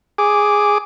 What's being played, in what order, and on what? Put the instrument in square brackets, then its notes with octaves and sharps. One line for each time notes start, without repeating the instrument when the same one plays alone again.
[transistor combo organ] G#4 D6